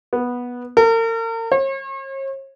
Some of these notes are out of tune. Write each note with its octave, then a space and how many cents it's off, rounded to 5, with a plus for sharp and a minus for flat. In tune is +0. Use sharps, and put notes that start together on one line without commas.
B3 -10
A#4 -40
C#5 -45